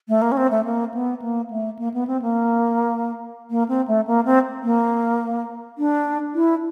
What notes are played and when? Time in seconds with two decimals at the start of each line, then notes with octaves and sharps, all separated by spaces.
0.08 A3
0.22 A#3
0.32 C#4
0.37 C4
0.51 A3
0.65 A#3
0.94 B3
1.22 A#3
1.50 A3
1.79 A#3
1.94 B3
2.07 C4
2.22 A#3
3.50 A#3
3.69 C4
3.88 A3
4.07 A#3
4.25 C4
4.63 A#3
5.78 D4
6.35 E4